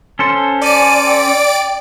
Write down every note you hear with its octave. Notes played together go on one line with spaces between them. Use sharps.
C#4 A4 C5
D5 G#5 D7
G5